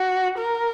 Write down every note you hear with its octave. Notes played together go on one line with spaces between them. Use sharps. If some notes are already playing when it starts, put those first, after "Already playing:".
Already playing: F#4
A#4